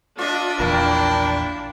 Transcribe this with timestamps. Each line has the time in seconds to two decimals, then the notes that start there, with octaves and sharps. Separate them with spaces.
0.19 D4 F4 D#5 E5
0.60 A#1 E2 E4 A#4 F5 G5 C#6